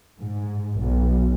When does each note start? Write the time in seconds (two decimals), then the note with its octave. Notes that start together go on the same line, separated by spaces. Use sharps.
0.20 G#2
0.79 B1